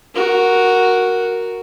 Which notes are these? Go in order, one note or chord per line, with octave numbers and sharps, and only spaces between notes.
F#4 A#4